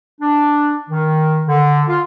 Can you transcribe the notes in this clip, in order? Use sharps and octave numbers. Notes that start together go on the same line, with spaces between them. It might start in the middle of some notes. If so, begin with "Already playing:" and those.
D4
D#3
D3
F4